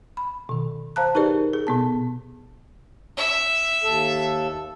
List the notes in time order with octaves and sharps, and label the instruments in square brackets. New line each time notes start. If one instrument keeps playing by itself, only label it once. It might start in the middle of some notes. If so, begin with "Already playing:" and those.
[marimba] B5
B2 D#3
C5 F5 A5 A#5 F#6
D#4 G4 G#4 A#4 B4 D5
G#4
B2 B3 A5
[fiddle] E5
[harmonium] D#2 A4